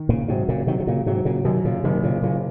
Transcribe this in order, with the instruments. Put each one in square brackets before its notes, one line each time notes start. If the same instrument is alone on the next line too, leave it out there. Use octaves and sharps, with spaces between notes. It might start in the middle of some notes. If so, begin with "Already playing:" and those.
Already playing: [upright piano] D#3
[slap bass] A#2 C#3
[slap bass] G#2 C3 [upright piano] F#3
[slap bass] A#2 C#3
[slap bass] C3 D#3 [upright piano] F#3
[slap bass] C3
A#2 C#3
[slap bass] G#2 C3 [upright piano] F#3
[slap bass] A#2 C#3
[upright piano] F#2 [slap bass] C3 D#3
[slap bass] A#2 C#3
[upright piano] F#1 [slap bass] C3 D#3
[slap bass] A#2 C#3
[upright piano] F#1 [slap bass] A#2 C#3